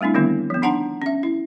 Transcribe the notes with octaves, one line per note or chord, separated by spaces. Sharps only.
G3 A3 C4 D4 E4
D3 D#3 G3 B3 E4
F3 B3
D4 D#4 F#5 A5 A#5 C6
C#4 E5
E4